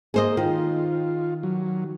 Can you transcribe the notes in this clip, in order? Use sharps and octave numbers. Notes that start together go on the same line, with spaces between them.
A#3 G#4 C5 D#5
D#3 F4
F#3